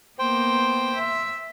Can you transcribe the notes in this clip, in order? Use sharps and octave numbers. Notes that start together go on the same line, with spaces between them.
A#3 B3 C5 G5
E5